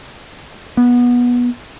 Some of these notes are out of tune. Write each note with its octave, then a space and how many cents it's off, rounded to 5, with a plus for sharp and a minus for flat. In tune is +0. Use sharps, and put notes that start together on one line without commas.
B3 -20